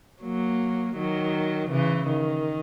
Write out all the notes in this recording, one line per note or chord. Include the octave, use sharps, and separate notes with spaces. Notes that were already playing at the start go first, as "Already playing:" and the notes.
F#3 A#3
D#3 F#3
C#3 E3
D#3